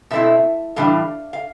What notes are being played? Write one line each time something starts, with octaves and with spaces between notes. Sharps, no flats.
B2 A3 C4 E4 E5
A2 E3 G3 D4 F5
F5